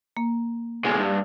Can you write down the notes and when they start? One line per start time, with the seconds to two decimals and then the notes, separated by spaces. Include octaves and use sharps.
0.17 A#3
0.85 B1 G#3
0.99 G2